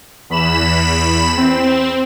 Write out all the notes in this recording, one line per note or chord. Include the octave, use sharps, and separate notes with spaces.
E2 B5 E7
C4